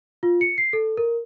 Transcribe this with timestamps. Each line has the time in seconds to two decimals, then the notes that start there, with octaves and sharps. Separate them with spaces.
0.23 F4
0.41 C#7
0.58 C7
0.73 A4
0.97 A#4